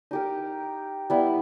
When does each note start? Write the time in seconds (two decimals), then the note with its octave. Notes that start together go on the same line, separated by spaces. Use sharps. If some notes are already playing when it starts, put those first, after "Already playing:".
0.11 D#4 G4 A#4
1.10 G3 B3 E4